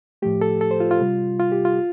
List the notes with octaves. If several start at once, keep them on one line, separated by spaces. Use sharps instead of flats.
A2 F3 A3 G4
A4
A4
C5
F4
F4
C3 G3
F4
G4
F4